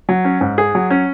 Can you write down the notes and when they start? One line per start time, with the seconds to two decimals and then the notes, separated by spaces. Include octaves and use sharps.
0.09 F#3
0.25 C#4
0.41 G#2
0.58 G#4
0.75 F#3
0.90 C#4